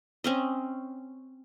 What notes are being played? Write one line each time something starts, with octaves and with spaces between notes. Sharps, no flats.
C4 C#4 D#5